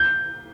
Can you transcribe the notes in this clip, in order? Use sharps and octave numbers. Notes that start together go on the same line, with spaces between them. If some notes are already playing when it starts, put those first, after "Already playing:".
Already playing: G6